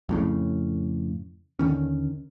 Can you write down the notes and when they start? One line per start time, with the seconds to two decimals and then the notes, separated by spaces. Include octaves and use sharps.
0.09 F2 A2 C#3
1.59 D#2 D3 D#3 C#4